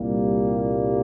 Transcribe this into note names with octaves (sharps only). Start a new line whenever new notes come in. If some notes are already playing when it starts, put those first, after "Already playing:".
Already playing: C2 A#2 G3 A#3